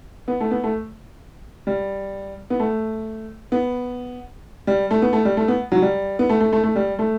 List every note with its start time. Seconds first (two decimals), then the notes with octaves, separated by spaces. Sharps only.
0.28 B3
0.40 A3
0.51 B3
0.64 A3
1.67 G3
2.50 B3
2.60 A3
3.52 B3
4.67 G3
4.91 A3
5.02 B3
5.13 A3
5.25 G3
5.37 A3
5.48 B3
5.72 F#3
5.82 G3
6.19 B3
6.29 A3
6.41 A3
6.53 A3
6.64 A3
6.76 G3
6.99 A3